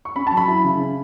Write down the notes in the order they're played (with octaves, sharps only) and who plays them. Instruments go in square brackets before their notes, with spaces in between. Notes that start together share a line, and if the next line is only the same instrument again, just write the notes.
[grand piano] C#6
C#4 B5
A5
F#3
B5
E4
C#3
C#4